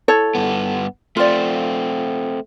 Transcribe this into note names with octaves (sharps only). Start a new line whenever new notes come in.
E4 A4 C#5
G2 B3
A3 C4 F4 D5